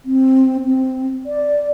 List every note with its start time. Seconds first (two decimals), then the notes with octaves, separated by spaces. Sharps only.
0.05 C4
0.66 C4
1.26 D5